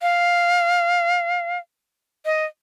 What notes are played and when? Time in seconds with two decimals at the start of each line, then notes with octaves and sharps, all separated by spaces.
0.02 F5
2.26 D#5